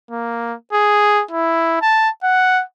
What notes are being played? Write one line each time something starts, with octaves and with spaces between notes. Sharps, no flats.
A#3
G#4
E4
A5
F#5